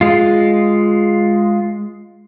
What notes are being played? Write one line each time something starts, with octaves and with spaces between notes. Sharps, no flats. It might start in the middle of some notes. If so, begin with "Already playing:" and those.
G#3 F4